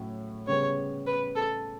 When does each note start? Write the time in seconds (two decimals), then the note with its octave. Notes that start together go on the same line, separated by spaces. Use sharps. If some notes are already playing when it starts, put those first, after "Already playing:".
Already playing: A2 F#3 C#4
0.47 C#3 G3 B3 C#5
1.06 B4
1.35 A4